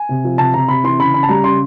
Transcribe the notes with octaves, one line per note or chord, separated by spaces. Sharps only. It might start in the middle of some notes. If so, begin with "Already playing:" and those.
Already playing: G#5
C3
F3
C3 A5
C3 A#5
C3 B5
E3 C6
C#3 B5
C#3 B5
A5
G3 A#5
C#3 C6